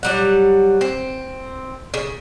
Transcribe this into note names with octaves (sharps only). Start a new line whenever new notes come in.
F#3 G3 F#5
C4
C#3